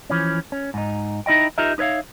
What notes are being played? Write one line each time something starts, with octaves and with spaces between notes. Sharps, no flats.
E3 F3 C#4
C#4
G#2 D#4
D#4 E4 D#5 G5
D#4 F4 G4 A#4 D#5 E5
D#4 B4 C#5 E5 F5